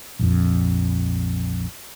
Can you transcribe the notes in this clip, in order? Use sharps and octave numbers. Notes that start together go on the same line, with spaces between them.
A#1 F2